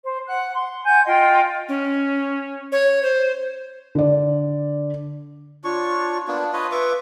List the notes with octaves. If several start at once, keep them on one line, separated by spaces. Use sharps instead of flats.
C5
F#5 F#6
C6
F#5 G#5 G6
F4 D#5 G5 C6
C#4
C#5
C5
D3 D5
D4 F4 C#5 C#6
A#3 B3 D4 A5
F4 B4 C#5 D#5
B4 E5 C#6 D6